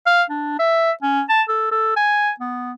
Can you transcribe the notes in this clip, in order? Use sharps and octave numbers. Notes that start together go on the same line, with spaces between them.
F5
D4
E5
C#4
A5
A4
A4
G#5
B3